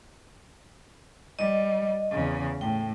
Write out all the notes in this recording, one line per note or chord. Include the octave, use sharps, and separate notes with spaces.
G3 D#5
E2 C#3
A2 G5